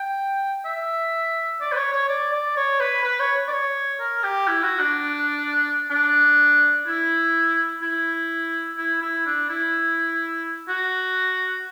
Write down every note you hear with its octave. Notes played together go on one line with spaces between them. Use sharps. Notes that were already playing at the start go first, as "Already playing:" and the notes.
Already playing: G5
E5
D5
B4
C#5
C#5
D5
D5
C#5
B4
B4
C#5
D5
C#5
A#4
G4
E4
F#4
D4
D4
E4
E4
E4
E4
D4
E4
F#4